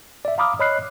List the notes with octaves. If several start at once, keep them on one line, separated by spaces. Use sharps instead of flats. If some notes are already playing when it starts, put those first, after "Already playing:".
D5 E5
F5 A#5 B5 D6 D#6 F6
C#5 D#5 B5 F6 F#6 C7